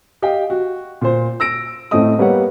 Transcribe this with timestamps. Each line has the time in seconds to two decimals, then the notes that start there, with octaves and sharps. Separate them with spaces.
0.22 G4 D#5 F5 G5
0.50 F#4
1.01 A#2 C5
1.40 E6 A#6 D7
1.91 A2 A3 C4 C#4 D#5 D#6
2.18 G3 A#3 B3 G4 C#5 F#5